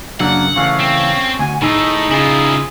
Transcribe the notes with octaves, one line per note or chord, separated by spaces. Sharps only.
F#2 C#3 F#3 A#3 D4 F#5
C#3 E3 A3 C#4 F5
C4
D2 F#4 G#5
A2 D#3 D#4 G#4 A4
C#3 E4 F4 G#4